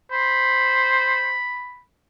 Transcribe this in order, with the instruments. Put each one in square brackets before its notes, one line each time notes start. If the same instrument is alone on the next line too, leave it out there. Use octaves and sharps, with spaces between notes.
[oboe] C5 [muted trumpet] B5